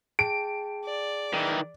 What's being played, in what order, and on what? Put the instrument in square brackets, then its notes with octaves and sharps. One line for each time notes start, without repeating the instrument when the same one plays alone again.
[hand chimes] G#4 G5 A5 [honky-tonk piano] D7
[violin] D5
[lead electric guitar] D#3 E3